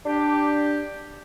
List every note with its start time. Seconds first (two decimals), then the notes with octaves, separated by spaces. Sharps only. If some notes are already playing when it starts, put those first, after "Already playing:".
0.06 D4 G4